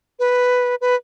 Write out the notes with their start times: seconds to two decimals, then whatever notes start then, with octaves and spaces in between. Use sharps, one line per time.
0.19 B4
0.81 B4